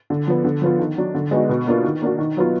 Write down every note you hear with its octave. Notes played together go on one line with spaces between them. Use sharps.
D3
F3 B3
D3
F3 B3 F4
D#3
F#3 D4
D3
G#3 B3 D#4 F#4
B2
A#3 D4 F4
D#3
A#3 D4 F#4
D#3
F#3 B3 F4